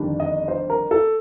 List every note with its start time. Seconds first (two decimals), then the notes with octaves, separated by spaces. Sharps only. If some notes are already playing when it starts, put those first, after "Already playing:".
Already playing: G1 F2 D#3 G3 D4
0.20 D#5
0.48 C5
0.70 A#4
0.91 A4